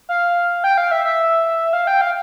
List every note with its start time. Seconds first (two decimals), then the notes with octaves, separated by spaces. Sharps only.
0.09 F5
0.64 G5
0.78 F5
0.91 E5
1.05 E5
1.73 F5
1.87 G5
2.01 F5